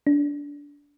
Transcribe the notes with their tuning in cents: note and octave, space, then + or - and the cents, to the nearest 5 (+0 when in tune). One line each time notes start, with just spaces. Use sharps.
D4 -20